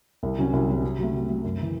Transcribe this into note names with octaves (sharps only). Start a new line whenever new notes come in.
C2
C3 F#3 C#4
C2
C3 F#3 C#4
C3
F#3 A3
C3
F#3 A3
F#2
C#3 E3